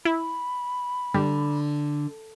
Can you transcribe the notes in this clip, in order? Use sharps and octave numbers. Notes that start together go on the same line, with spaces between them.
E4 B5
D3 G3